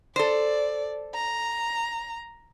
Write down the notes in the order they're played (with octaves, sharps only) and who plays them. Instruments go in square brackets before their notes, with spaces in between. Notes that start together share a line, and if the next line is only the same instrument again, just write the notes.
[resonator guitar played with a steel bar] A4 C5 [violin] D5
[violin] A#5